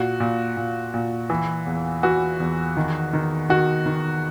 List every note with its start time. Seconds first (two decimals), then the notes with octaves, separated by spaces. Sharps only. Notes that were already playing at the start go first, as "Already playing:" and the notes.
Already playing: A#2 F#4
0.20 A#2
0.57 A#2
0.94 A#2
1.30 E3
1.66 E2
2.03 E3 F#4
2.40 E2
2.77 D#3
3.13 D#3
3.49 D#3 F#4
3.86 D#3